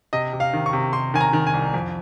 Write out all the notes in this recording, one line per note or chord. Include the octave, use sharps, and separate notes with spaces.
C3 D#5
C3
F5
D#3
C#6
C3
C3 C6
D#3 G#5
A#5
D#3
G#5
C2
F2